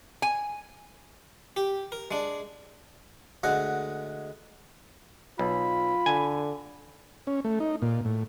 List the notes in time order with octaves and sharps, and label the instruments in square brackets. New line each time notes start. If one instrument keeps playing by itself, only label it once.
[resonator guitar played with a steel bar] G#5
[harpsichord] G4
A#4
G#3 D4
D2 G#3 F#5 G#5
[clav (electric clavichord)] B1 [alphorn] F4 [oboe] B5
[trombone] D3 [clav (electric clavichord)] G#5
[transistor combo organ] C#4
A3
D#4
A#2
A2